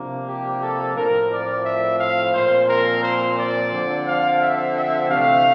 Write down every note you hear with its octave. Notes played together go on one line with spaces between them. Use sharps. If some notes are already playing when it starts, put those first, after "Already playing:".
Already playing: C3 F3 A#3 D4
G4
A4
A2 F3 C4 A#4
D5
E5
F5
A#2 F3 C4 C5
A#4
C5
D5
D3 F3 C4
F5
E5
E5
C3 E3 A3 D4 F5